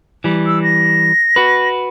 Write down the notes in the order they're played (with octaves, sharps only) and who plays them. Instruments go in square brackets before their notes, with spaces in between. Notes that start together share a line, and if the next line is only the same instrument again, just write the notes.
[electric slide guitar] E3 G3
[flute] E6
A#6
[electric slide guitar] F#4 B4